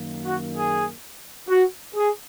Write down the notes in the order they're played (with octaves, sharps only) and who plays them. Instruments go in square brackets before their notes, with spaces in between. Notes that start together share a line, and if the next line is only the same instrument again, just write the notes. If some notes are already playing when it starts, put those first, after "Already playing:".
Already playing: [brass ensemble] F#2 D#3 A#3
F#4
G#4
F#4
G#4